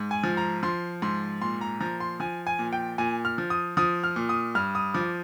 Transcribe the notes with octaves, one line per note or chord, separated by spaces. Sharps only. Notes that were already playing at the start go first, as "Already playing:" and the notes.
Already playing: G#2
G#5
F3
A#5
F3 C6
G#2 C6
A#2 C6
A#5
F3 A#5
C6
F3 G#5
G#5
A#2
G5
A#2 G#5
F6
F3
D#6
F3 D#6
F6
A#2
D#6
G2 F6
D#6
F3 D6